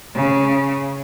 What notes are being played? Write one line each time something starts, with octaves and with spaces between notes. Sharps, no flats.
C#3